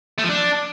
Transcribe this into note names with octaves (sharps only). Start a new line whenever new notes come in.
A3
F3
D4